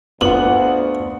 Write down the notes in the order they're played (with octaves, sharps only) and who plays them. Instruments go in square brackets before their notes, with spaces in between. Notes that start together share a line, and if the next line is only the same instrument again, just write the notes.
[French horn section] D2 [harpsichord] G2 [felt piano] B3 F4 [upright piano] F#5 F#7